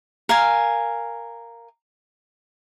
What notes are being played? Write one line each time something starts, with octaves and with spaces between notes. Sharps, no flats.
A#4 F5 G#5